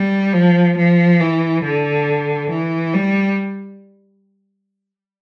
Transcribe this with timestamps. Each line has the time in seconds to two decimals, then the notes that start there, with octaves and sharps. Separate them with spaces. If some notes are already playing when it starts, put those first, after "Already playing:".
Already playing: G3
0.33 F3
0.77 F3
1.20 E3
1.63 D3
2.50 E3
2.94 G3